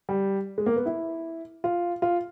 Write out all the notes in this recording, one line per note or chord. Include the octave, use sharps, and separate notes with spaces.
G3
G#3
A#3
B3
E4
F4
F4